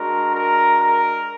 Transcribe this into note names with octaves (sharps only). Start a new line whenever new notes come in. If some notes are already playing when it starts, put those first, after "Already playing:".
Already playing: G#3 D4 F#4 A#4
A#4
A#4